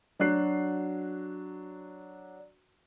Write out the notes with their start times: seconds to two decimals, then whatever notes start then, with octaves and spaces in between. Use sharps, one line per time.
0.19 F#3 D4 F#4 F#6 C7